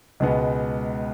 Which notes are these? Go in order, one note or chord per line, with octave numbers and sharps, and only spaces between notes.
C#2 B2 G#3 B3